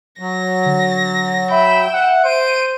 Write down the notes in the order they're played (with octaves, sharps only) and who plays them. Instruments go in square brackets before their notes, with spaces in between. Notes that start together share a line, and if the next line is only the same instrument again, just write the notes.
[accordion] F#3 [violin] A#6
[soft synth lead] D3
[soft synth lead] E5 [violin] G5 E7 [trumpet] B5
[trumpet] F#5
[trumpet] C5 [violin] D7 D#7